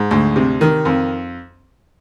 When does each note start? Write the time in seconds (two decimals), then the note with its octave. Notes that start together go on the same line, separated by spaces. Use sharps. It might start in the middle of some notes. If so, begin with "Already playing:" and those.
Already playing: G#2
0.11 D2
0.36 C3
0.61 D#3
0.85 F2